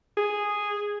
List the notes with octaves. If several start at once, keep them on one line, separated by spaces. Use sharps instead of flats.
G#4